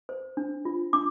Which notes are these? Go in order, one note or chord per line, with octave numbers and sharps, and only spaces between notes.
C5
D4
F4
D4 D6